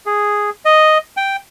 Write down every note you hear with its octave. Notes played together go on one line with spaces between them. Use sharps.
G#4
D#5
G5